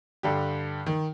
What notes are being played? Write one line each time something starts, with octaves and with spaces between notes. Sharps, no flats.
G2 D3 G4
D#3